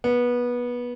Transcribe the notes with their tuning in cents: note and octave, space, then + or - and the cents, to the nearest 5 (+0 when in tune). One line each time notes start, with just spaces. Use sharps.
B3 -20